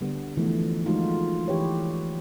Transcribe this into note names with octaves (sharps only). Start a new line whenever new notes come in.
D3 G3 B3
E3 F3 A3 B3
F3 G#3 A3 D#4 F4 F#4
E3 G4 B4 C#5